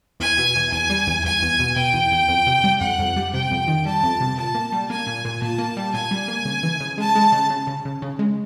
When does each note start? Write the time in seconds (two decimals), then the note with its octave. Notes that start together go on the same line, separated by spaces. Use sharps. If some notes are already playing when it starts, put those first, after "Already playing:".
0.20 E2 G#5
0.38 B2
0.56 E2
0.72 E2 G#5
0.90 G3
1.07 E2
1.25 E2 G#5
1.42 E2
1.59 B2
1.76 B2 G5
1.94 E2
2.11 E2
2.28 F2
2.47 C3
2.64 G3
2.81 F2 F#5
2.99 F2
3.16 G3
3.34 C3 G5
3.51 F2
3.67 D#3
3.85 G3 A5
4.03 F2
4.20 C3
4.37 A#2 A5
4.54 A#3
4.72 G3
4.90 A#3 G#5
5.07 A#2
5.25 A#2
5.42 A#2 A5
5.58 A#3
5.77 G3
5.94 A#2 G#5
6.11 G3
6.28 A#3
6.45 C#3
6.63 E3
6.80 C#3
6.98 G#3 A5
7.15 G#3
7.32 C#3
7.50 C#3
7.67 C#3
7.85 C#3
8.02 C#3
8.19 G#3